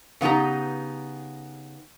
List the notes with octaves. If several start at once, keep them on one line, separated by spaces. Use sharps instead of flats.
C#3 B3 D#4 G4 A#5